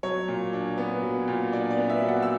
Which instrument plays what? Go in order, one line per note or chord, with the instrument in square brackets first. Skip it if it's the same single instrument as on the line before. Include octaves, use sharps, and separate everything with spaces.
[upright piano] F#3 C#5
A#2
D4
B3
F#3
A#2
D4 D5
D5
B3
E5
F#3
F#5
E6